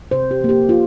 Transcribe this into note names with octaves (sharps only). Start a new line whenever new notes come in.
C3 C5
G4
F3 A#3
G4
C3 F4